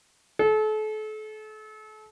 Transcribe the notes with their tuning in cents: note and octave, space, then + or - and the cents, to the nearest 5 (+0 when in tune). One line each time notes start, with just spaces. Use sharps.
A4 -35